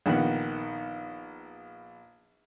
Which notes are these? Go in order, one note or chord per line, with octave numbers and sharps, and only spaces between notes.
A#1 D#3 B3 F#5